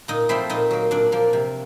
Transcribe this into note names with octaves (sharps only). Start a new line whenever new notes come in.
A#2 D#4 D#5
F3 A3 C4 E4 E5
A#2 D#4 D#5
F#3 A#3
A#2 D4 D5
F3 A#3
C3